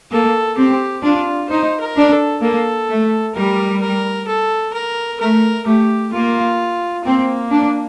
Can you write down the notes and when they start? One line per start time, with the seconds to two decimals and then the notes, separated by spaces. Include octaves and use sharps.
0.11 A#3 A4
0.57 C4 G4
1.03 D4 F4
1.49 D#4 C5
1.80 A#4
1.97 D4
2.12 A4
2.42 A#3 A4
2.89 A3
3.35 G3 A#4
3.82 A#4
4.28 A4
4.74 A#4
5.20 A3 A#4
5.67 A3 G4
6.13 A#3 F4
7.05 A#3 C4
7.52 D4